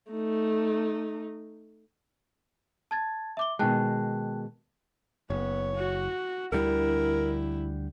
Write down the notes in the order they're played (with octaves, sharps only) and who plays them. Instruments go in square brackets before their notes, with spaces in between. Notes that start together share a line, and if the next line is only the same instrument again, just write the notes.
[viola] A3 D#4
[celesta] A5 G#6 A6
E5 D6 G7
[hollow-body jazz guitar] B2 D#3 G#3 [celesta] G5 A5 F#6
[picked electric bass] F#1 [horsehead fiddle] B3 [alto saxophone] C#5
[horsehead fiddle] F#4
[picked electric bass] D2 D3 G3 [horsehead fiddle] E4 [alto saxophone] A#4